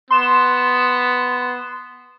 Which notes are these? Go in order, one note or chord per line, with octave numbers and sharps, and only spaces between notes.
B3 C6 E7